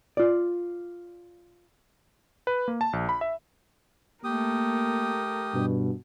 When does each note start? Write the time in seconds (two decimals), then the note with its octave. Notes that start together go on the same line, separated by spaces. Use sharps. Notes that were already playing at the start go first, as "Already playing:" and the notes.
0.17 F4 D5
2.47 B4
2.68 A#3
2.81 A5
2.93 A#1
3.09 B5
3.21 E5
4.24 A3 A#3 G4 A#4 D#6
5.54 G2 B2